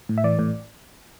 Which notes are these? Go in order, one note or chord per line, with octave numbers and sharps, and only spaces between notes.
A2
E5
E3 D5
A2